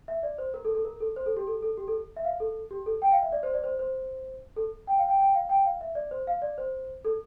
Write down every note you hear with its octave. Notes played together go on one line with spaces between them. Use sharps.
E5
D5
C5
A#4
A4
A4
A#4
A4
C5
A4
G4
A4
A4
G4
A4
E5
F5
A4
G4
A4
G5
F5
E5
D5
C5
D5
C5
C5
A4
G5
F5
G5
G5
F5
G5
F5
E5
D5
C5
F5
D5
C5
A4